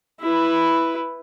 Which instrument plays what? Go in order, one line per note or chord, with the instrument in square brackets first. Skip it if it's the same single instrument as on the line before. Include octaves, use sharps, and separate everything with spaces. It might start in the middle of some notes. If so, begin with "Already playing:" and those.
[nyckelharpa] E4 B4